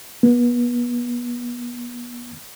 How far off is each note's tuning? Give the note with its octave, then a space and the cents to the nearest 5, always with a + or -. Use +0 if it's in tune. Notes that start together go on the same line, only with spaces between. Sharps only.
B3 -35